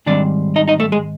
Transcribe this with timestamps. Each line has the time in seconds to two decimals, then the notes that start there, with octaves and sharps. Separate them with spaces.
0.06 G#2 D#3 G3 C4 D4 D5
0.56 D#4 D#5
0.68 D#4 D#5
0.80 A3 A4
0.92 G#3 G#4